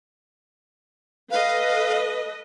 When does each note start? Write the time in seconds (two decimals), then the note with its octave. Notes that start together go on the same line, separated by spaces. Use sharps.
1.31 A4 B4 D#5 F5